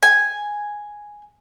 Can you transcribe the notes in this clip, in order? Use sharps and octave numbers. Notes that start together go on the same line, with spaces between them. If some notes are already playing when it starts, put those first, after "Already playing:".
G#5